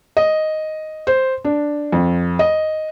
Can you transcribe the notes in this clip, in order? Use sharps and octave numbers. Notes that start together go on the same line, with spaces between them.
D#5
C5
D4
F2
D#5